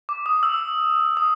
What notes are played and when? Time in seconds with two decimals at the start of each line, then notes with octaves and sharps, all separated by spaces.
0.09 D6
0.26 D#6
0.43 E6
1.17 D#6